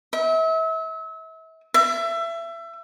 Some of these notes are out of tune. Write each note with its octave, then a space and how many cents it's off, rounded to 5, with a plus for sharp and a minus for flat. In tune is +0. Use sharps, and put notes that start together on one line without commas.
E5 -35
E5 +25